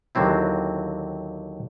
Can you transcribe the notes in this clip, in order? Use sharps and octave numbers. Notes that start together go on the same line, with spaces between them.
D#2 D3 F#3 C4 E4